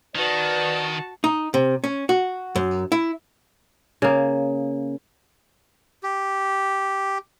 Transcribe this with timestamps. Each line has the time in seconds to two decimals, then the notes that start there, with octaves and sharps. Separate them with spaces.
0.16 D#3 F#4 B4 D5 A5
1.24 D#4
1.54 C3
1.84 C#4
2.09 F#4
2.56 F#2
2.92 E4
4.02 C#3 A#3
6.03 G4